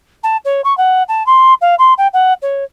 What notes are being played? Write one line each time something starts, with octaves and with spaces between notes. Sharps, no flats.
A5
C#5
C#6
F#5
A5
C6
F5
C6
G5
F#5
C#5